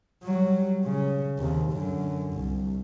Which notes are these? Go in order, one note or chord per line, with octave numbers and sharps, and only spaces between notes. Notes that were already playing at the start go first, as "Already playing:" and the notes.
F#3 G3
C#3
D#2 C3
F#2 D3
C2